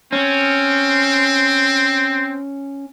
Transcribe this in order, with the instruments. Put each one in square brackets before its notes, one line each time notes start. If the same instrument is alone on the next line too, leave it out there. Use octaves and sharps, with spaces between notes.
[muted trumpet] C4 [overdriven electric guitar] C#4